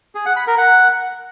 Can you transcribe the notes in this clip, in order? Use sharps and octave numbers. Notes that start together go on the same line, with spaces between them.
G#4
F#5
B5
A#4
F#5